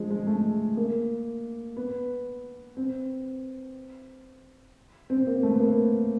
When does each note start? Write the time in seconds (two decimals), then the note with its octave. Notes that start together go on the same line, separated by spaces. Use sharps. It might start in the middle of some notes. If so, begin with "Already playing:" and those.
Already playing: F3 G#3
0.10 G#3
0.27 A3
0.77 A#3
1.77 B3
2.77 C4
5.10 C4
5.27 A#3
5.43 A3
5.53 B3
5.60 A#3